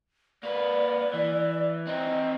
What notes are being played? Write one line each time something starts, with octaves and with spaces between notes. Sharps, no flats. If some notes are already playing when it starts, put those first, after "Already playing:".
A#3 B4 D5
E3
C4 D#4 D#5